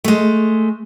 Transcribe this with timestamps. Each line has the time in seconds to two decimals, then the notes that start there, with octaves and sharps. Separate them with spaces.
0.04 G#3 A3